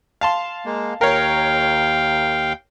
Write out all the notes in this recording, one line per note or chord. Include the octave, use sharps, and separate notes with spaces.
F5 A5 C6
G#3 A#3
D#2 A#4 C#5 F5 G5